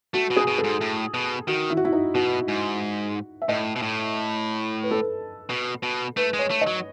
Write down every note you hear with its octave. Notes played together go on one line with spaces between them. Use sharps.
A3 F#4
B2
G#4
B2
A4
G#2
A2
B2
D#3 F#4
E4
F#4
E4
D#4
B2 F#4
G#2
E5
A2 D#5
B2
A2
B4
A4
B4
B2
B2
A3 B4
G#3
C#5
A3
D#5
F#3